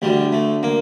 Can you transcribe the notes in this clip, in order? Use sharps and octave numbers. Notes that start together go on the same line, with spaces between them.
D2 D3 G3
A3
A#3